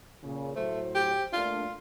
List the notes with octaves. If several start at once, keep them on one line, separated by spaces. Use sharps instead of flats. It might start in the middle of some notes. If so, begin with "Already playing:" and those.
A#2 C#3
A2 F#3 A3 C5
G4
A3 A#3 D4 F4